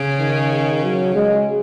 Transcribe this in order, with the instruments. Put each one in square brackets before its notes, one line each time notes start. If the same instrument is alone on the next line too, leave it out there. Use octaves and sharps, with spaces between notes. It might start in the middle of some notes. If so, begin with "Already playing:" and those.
Already playing: [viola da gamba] C#3
[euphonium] D#3
F#3
G#3